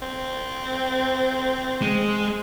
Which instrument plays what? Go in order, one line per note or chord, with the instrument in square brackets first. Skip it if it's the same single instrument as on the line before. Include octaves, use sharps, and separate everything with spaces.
[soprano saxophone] C4
[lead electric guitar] G#3